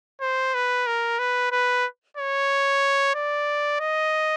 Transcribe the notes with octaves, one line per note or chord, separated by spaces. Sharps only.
C5
B4
A#4
B4
B4
C#5
D5
D#5